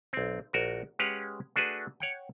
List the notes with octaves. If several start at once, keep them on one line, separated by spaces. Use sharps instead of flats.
B1 C4
A#1 F#4 A#4
G#3 C#4 G4 B4 F5 F#5
A3 D4 F#4 G#4 B4
C#5 F#5 G5